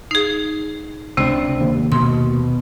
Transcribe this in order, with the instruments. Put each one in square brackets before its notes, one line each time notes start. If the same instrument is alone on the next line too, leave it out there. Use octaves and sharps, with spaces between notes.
[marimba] D#4 G#4 [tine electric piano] C7
[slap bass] C#2 D4 [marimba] C3 C5 [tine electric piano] C4
[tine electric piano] D#2
[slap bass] B2 [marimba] C6